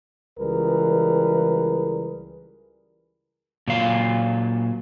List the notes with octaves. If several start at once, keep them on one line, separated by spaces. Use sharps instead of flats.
C#2 E3 G3 G#4 A#4 B4
A#2 F#3 F5